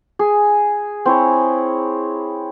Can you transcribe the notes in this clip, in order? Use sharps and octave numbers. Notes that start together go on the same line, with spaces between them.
G#4
C4 E4 C#5